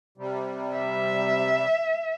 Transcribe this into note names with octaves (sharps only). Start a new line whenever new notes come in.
C3 G3
E5